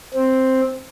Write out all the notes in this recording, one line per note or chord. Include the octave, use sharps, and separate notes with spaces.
C4